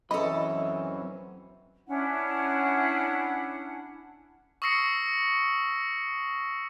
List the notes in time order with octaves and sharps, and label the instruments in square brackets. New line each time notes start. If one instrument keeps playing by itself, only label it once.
[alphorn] E3 [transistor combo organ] F#3 C4 C#4 [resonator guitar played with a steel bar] A4 D#5 [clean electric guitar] B5
[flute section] C#4 D4 E4 F#5
[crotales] C#6 D#6 E6 A#6 C7 C#7